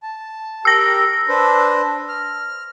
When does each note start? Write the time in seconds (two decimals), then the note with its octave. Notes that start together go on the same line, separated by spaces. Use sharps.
0.03 A5
0.65 G4 A#4 G5 E6 A#6
1.28 D4 B4 C5
2.09 F6